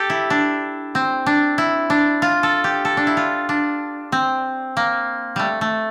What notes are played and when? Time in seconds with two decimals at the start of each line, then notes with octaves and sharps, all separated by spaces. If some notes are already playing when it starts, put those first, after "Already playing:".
Already playing: G4 A4
0.10 E4
0.30 D4
0.95 C4
1.26 D4
1.58 E4
1.90 D4
2.22 F4
2.43 A4
2.64 G4
2.85 A4
2.97 D4
3.07 E4
3.17 F4
3.49 D4
4.12 C4
4.77 A#3
5.36 G3 A3
5.61 A3